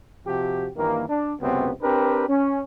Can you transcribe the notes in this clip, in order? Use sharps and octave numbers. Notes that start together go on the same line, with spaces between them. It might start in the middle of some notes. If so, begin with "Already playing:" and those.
C3 F3 F#4 G4
G2 D#3 E3 A#3
D4
C#2 F#2 C3 B3 C4
C4 D4 G4 A#4 B4
C#4